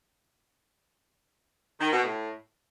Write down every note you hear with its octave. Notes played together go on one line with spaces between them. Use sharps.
D#3
B2
A2